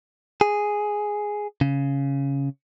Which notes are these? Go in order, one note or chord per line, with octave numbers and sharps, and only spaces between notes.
G#4
C#3